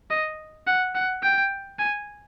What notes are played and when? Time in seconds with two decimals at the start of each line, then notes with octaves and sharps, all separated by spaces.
0.10 D#5
0.67 F#5
0.95 F#5
1.23 G5
1.79 G#5